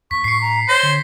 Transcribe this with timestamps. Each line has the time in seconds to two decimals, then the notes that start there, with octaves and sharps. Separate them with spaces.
0.11 E2 C#6 B6
0.24 A2 C7 C#7
0.41 A#5
0.69 C5 C#5 A#6
0.83 D3